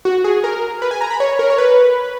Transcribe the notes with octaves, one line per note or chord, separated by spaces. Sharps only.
F#4
G#4
A#4
B4
G#5
A#5
B5
C#5
A#4
C#5
B4